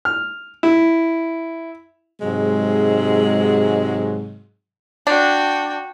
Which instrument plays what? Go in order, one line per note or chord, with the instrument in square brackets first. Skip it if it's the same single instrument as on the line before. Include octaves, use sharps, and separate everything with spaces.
[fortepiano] F6
E4
[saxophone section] G#2 C3 F#3 G#3
[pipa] D4 [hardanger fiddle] F#4 G5